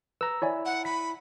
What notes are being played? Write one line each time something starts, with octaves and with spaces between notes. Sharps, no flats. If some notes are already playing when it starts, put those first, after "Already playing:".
B4 A#5 E6
E4 C#5 D5 G#5
F#5
B5 B6